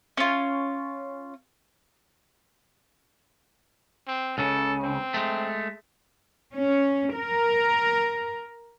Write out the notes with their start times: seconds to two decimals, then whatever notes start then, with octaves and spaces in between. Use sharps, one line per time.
0.17 C#4 F4
4.08 C4
4.38 C#2 C#3 A4
4.83 C4
5.14 G#3 A3
6.53 C#4
7.16 A#4